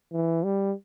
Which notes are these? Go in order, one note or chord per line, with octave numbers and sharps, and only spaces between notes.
E3
G3